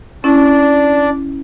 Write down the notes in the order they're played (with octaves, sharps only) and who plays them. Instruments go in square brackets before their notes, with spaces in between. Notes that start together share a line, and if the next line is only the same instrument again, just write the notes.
[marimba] C#4 E4 [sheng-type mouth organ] D4 D5